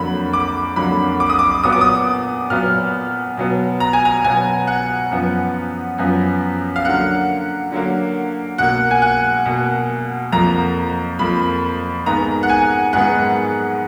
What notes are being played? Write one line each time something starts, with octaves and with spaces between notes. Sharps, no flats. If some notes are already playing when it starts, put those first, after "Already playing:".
Already playing: F2 D3 F#3 A#3 B5
D6
F2 D3 F#3 A#3 B5
D6
D#6
D6
A#2 F#3 B3 D#6
D6
D#6
A#2 F#3 B3 F6
B2 F#3 B3
A#5
G#5
A#5
B2 F#3 B3 G#5
F#5
F#2 F3 B3
F#2 F3 B3
F5
D3 F#3 A#3 F#5
D3 F#3 A#3
B2 A#3 F#5
G#5
F#5
B2 A#3
F2 F3 A#3 A#5
F2 F3 A#3 B5
G#2 D#3 G#3 B3 A#5
F#5
G#5
G#2 D#3 G#3 B3 F#5